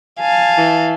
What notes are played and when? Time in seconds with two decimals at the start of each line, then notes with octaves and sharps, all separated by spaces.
0.20 F5 G#5 A5
0.57 E3